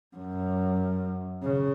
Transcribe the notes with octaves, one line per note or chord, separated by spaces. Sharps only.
F#2
C#3